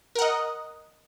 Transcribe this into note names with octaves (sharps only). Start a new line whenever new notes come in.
A#4 D#5 F#5